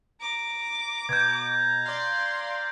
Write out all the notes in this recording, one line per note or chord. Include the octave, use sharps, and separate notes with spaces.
A#5 D6
B2 G6 G#6
D5 F5 C6